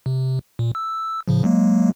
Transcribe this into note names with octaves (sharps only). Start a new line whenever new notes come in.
C3
A#2
E6
A2 C#3 F3
F#3 G#3 A#3